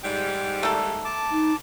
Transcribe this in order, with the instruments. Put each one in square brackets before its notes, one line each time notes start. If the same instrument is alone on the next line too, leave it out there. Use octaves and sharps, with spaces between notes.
[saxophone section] G#2 G3 [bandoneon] G5
[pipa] A3 A#3 A4
[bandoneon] A5 D6
[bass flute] D#4